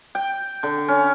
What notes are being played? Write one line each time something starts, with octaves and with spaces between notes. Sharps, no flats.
G5
D3
C#4